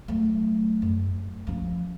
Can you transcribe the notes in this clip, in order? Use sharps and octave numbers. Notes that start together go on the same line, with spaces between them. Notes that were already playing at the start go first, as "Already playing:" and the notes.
F#3 A3
F#2
F3 C#4